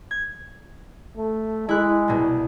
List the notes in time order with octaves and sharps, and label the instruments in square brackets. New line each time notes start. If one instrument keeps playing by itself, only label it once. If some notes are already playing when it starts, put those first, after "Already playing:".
[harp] G#6
[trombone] A3
[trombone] G#3 [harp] E4 F#6
[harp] C2 B2